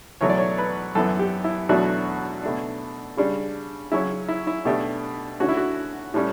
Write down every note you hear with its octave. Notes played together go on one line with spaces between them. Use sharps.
E2 B2 F#3 A3 C#5
D5
C#5
B4
F#2 E3 B3 A4
G4
E4
E2 B2 F#3 A3 D4 F#4
B2 A3 D4
C#3 G3 D4
C#3 F#3 C#4 E4
E4
E4
B2 A3 D4 G4
D3 A3 C#4 F#4
E4
F#4
A2 G3 C#4